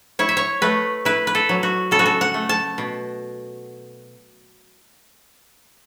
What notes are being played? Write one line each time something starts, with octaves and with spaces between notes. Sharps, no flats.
E4 C#5
E5
C#5
A3 B4
E4 B4
B4
A4
F#3
F#4
C#3 A4
F#4
A4
F#5
A3
A5
B2